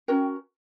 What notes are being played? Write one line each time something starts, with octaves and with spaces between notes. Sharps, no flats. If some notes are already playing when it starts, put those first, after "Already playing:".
C#4 F#4 A#4 G5